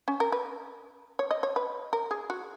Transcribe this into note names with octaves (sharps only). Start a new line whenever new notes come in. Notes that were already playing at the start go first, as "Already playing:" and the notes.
C#4
A#4
B4
C#5
D#5
C#5
B4
A#4
G#4
F#4